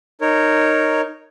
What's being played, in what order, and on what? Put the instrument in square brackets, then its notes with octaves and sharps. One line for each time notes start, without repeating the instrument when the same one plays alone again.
[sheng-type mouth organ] D#4 A#4 C#5